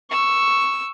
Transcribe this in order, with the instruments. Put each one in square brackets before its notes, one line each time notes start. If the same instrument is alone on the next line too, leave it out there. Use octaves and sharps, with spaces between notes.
[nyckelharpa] C#6 [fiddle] E6